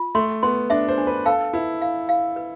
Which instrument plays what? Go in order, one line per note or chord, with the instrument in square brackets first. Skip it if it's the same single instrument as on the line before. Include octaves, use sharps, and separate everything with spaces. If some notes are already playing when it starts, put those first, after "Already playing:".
Already playing: [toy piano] F4
[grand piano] A3 [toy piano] C6
[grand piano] B3 [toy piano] C6
[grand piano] D4 [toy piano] E5
[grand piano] C5
[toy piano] D4
[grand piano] B4
[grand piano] A4 [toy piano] F5
[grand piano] E4 [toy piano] B4
[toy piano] F5
F5
B4